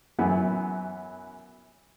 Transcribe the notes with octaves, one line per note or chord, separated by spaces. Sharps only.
F#2 E3 B3